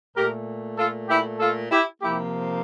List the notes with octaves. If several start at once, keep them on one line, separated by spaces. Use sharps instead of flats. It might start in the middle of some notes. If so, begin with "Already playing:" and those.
A#2 A3 G4 A#4
F4 A4
E4 G4
F4 A4
E4 G4
C3 F3 A#3 E4 G4